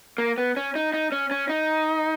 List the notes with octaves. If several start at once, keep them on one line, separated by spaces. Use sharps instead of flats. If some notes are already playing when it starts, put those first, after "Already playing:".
A#3
B3
C#4
D#4
D#4
C#4
C#4
D#4